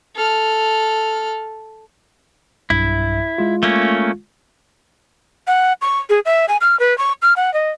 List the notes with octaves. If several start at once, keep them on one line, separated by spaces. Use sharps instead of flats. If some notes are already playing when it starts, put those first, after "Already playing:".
A4 F6
B1 G2 E4 E5
G#3 F4
A3 A#3 C#4
F#5
C#6
G#4
E5
G#5
F6
B4
C#6
F6
F#5
D#5